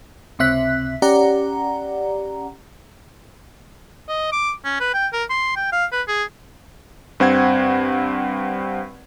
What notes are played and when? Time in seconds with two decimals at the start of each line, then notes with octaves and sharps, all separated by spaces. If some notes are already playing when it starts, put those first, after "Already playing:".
0.39 C#2 C3 C4 E5 F#6 B6
1.02 C#4 G4 D5 F#5 A#5
4.08 D#5
4.32 D6
4.64 C#4
4.80 B4
4.94 G5
5.13 A#4
5.30 C6
5.56 G5
5.72 F5
5.92 B4
6.08 G#4
7.20 G2 C4 F#5 G#6